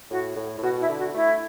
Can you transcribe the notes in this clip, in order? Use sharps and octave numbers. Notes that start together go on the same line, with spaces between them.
A2 F#4
A2
A2
B2 F#4
E4
D3
F#4
A3 E4